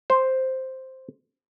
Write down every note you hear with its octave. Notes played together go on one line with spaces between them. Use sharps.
C5